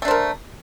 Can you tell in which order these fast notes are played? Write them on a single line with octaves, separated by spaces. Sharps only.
A3 D4 C5 A#4